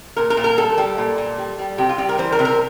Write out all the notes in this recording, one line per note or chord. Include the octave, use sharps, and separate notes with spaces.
A#2 A#4
A#4
A#2
A#4
G3 A4
G3
A#2
A#2
G3
G3
C3 G4
F4
G3 G4
A#4
E3 C5
A#4
C3
A#4